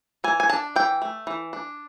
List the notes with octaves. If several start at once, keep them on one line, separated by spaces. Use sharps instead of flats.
E3 G#5
G#5
D4 A5
E3 G5
A3
E3
D4